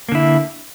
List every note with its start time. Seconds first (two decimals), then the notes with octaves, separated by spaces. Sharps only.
0.09 A#3
0.12 D3
0.15 E4